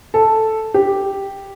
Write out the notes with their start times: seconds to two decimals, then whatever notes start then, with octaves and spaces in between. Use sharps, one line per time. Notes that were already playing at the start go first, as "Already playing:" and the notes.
0.14 A4
0.74 G4